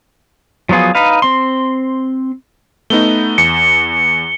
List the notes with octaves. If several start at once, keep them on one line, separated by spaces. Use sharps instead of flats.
F3 F#3 B3 F4 G#4
D#4 B4 F5
C4 C6
A3 B3 D#4 G7
E2 C#7